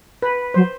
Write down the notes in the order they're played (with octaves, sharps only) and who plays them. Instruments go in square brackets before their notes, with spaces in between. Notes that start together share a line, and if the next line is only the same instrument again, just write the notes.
[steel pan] B4
[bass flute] F#3 [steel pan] C5